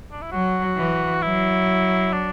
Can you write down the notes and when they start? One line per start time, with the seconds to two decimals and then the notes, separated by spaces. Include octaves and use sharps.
0.12 D4
0.22 E4
0.32 F#3 F#4
0.77 E3
1.22 F#3 E4
2.13 D4